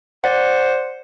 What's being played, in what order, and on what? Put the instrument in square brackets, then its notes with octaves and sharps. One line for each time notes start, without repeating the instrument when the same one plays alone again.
[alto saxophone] C5 [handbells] D5 F#5